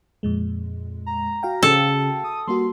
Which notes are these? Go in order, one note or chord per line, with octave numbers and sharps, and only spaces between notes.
F2 A#2 G#3
A#5
F#4 F5 G5
C#3 A4
D#6
G3 A#3 F#4 C6